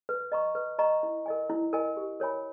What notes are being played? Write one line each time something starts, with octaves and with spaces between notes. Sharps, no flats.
B4
D#5 A#5 C#6
B4
D#5 A#5 C#6
E4
A#4 D#5 G#5
E4
A#4 D#5 G#5
G4
A#4 C#5 G#5 B5